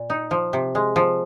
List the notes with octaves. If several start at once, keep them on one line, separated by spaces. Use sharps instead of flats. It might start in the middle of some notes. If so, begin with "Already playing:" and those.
Already playing: A#2
D#4
F3
C3
G#3
F3